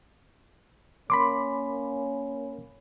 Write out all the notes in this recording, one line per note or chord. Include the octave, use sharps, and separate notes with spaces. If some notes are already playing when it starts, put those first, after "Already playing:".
A#3 C#4 B5 C6 D6